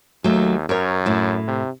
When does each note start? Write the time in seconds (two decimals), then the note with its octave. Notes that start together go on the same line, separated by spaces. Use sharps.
0.24 D#2 F#3 A3
0.69 F#2 A#4 C#5
1.06 A2 E4
1.48 C3